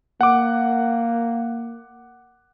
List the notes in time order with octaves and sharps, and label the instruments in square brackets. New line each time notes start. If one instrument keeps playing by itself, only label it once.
[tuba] A#3 [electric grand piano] F#5 D6